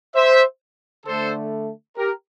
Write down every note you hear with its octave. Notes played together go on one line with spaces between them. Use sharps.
C5 E5
D3 A3 A4 C5
G4 A#4